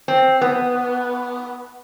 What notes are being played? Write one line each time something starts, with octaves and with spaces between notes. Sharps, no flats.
C4
B3